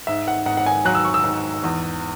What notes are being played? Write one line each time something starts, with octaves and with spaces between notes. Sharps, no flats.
G#2 E5
F#5
G#2 F#5
F#5
G#5
F#3 F#6
E6
C#6
E6
G#2
E2